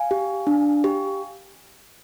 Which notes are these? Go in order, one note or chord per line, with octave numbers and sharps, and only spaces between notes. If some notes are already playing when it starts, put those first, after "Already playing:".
Already playing: F5 G#5
G4
D4
G4